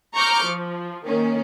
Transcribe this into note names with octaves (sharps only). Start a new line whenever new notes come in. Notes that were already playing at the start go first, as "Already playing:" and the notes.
A#5 C#6 D6 F6 G6
F3
D#3 A#3 C#4